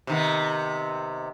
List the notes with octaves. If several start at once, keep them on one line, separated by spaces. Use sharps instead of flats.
C3 D#3 B3